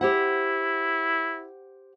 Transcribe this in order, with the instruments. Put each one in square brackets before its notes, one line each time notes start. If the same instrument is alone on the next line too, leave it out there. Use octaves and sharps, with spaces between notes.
[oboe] E4 [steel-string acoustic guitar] G4 C5 F#5